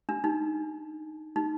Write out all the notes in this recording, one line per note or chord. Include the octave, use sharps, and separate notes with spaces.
D4
D#4
D#4